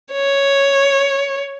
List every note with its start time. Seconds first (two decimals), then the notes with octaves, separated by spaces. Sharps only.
0.13 C#5